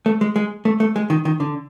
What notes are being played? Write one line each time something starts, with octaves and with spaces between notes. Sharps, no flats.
A3
G#3
G#3
A3
A3
G#3
D#3
D#3
D3